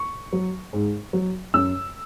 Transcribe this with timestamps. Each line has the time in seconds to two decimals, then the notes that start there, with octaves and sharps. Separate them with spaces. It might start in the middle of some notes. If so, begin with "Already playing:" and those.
Already playing: C#6
0.32 F#3
0.73 G#2
1.13 F#3
1.54 F#2 E6